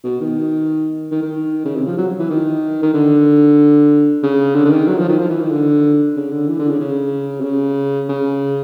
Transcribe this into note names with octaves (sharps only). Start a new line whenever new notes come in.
B2
D#3
D#3
D#3
C#3
C3
F3
F#3
E3
D#3
D#3
D3
C#3
D3
D3
D#3
F#3
F3
D#3
F3
E3
D#3
D3
C#3
D3
E3
D3
C#3
C#3
C3
C#3
C#3